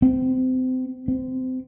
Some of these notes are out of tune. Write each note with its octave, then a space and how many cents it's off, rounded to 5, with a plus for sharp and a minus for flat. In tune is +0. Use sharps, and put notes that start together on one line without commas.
C4 -30
C4 -25